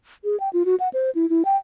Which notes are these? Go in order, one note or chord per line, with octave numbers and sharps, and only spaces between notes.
G#4
G5
F4
F#4
F#5
C5
E4
E4
G5